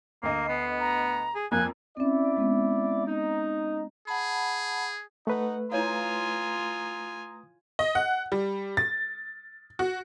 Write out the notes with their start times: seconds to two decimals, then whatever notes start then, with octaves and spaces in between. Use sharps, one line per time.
0.23 D2 A#3 D#5 C7
0.48 B3
0.80 A#5
1.35 G#4
1.52 F2 A#3 G#5 F#6
1.97 C4 C#4 E4 D5
2.37 G#3 B3 C4
3.06 D#4
4.07 G#4 F#5 A5 B5
5.27 A3 D#4 B4 F#5
5.72 E4 F4 C#5 F5 G#5 A#5 C6 D#6
7.79 D#5
7.95 F#5
8.32 G3
8.77 A6
9.79 F#4